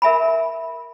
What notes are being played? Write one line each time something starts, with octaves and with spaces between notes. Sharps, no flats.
A#4 E5 G#5 B5